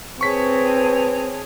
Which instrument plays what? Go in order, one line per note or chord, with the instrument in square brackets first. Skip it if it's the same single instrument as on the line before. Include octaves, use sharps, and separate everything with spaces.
[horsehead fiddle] C4 [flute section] G#4 C#5 A5 [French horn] B4 [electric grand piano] C#6 B6